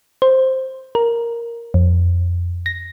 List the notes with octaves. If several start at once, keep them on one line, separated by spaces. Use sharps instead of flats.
C5
A#4
F2
A#6